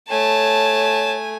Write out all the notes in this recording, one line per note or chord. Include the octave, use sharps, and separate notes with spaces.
A3 C#5 G#5 A5